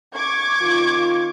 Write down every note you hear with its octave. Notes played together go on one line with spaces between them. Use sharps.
C#6 D6 G#6
D#3 C4 F4